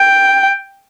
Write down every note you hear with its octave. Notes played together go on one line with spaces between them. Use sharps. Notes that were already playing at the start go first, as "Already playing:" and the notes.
Already playing: G5